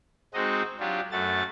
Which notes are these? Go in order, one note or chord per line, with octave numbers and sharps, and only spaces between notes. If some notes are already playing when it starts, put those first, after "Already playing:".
G#3 C4 D#4 F#4 D#5
F#3 D4 F4 G4
F#2 A3 F#4 A6